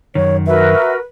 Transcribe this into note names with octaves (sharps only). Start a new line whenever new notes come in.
F#2 D#3 C#5
F#4 A#4 B4 E5